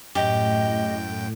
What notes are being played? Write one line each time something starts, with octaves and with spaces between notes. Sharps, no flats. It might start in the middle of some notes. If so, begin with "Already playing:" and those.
F#2 A2 G4 D#5 G5